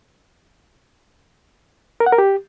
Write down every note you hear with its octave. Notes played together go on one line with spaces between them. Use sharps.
A#4
F#5
A#4
G4